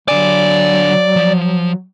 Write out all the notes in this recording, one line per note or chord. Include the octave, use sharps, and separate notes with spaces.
D3 F#3 D5 G#5
F3